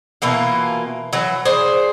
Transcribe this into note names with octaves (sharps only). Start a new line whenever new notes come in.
B2 E3 A#3 F4
E3 F#3
G#4 C5 D5